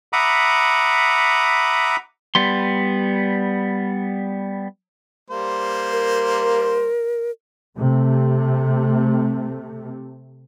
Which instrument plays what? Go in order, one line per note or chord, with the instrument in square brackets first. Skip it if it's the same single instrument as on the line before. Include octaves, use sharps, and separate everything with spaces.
[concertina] E5 F#5 A#5 B5 D6 D#6
[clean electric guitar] G3 B3 C6
[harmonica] G3 A#3 C5
[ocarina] A#4
[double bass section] C3 A3